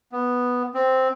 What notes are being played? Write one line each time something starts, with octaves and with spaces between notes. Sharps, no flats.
B3
C4